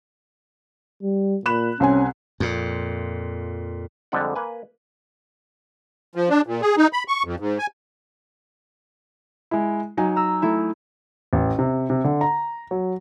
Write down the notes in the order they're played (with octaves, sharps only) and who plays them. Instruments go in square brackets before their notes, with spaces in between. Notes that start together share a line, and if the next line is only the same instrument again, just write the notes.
[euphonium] G3
[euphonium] A#2 [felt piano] B5 F#6 E7
[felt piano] C2 C4 G#5 [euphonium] C#4
[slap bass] F2 A#2
[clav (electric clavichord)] F2 D3 G3 G#3 D5 F#5
A#3 B4 G#5
[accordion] F3
D4
A#2
G#4
D#4
B5
C#6
F2
G#2
G#5
[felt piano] G#3 E4
F#3 D#4 G#5
[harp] A#5 E6
A3 E4
[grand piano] A1
C3
C3
D3
A#5
F#3